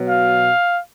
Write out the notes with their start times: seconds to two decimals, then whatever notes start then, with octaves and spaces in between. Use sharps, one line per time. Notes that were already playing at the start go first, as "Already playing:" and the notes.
Already playing: B2 F#3
0.09 F5